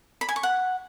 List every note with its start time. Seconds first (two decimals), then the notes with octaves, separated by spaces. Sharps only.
0.21 B5
0.29 G#5
0.36 C#6
0.43 F#5